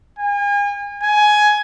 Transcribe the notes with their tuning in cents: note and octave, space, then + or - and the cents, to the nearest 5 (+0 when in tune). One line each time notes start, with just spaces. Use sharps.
G#5 -40
G#5 +15